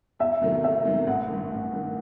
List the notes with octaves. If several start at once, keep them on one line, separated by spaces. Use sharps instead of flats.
E2 E5
C3 D#3 F#3 A3
E2 E5
C3 D#3 F#3 A3
A1 F#5
G2 D#3
A1
G2 D#3